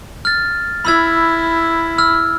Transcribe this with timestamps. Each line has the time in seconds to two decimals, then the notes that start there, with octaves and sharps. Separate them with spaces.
0.25 F6 A6
0.85 E4 B5 E6 G#6
1.98 E6 F6